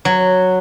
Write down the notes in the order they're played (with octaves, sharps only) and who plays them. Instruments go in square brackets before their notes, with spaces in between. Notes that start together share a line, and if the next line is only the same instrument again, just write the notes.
[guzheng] F#3